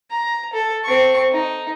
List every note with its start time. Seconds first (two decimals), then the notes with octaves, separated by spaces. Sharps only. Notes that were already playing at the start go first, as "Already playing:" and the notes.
0.11 A#5
0.53 A4
0.84 C4 C#6
1.32 D#4